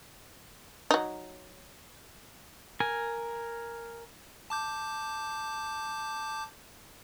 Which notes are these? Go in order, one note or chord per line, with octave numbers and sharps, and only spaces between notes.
F#3 D#4
A#4 G#5
A5 D6 G6